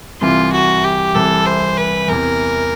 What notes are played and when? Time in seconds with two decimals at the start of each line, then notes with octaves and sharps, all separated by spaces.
0.21 C2 C3 E3 F4
0.52 F#4
0.84 G4
1.15 C2 C3 E3 A4
1.46 C5
1.77 B4
2.08 E2 C3 E3 A#4